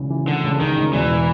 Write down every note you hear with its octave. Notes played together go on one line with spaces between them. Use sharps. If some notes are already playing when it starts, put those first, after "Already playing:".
Already playing: C#2 C#3 E3
E3
D3 E3
C#2
C#2 D#3
C#2
E1 E3